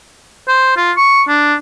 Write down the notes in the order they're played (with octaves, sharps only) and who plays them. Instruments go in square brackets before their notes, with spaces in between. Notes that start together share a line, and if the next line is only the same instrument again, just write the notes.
[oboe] C5
F4
C#6
D4